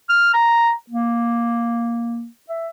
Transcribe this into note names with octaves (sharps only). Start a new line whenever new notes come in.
F6
A#5
A#3
E5